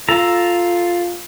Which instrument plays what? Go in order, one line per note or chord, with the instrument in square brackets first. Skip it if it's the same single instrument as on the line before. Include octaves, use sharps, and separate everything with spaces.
[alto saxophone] F4 [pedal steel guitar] A4 A#5